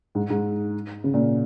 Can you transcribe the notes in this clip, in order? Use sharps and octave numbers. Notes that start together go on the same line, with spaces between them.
G#2
G#2
C#3
A#2